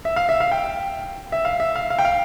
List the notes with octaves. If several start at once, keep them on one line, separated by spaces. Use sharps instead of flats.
E5
F5
E5
F5
G5
E5
F5
E5
F5
F5
G5
F5